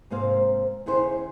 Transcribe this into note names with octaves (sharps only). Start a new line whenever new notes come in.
G#2 C3 A#3 C5 F5
D#2 C#3 E4 C5